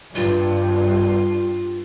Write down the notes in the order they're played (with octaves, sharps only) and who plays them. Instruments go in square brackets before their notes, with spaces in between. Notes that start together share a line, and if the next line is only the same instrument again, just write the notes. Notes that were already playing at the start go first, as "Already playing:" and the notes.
[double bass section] G2 [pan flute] F4